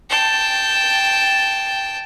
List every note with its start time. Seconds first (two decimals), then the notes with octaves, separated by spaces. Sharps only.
0.10 G5 A5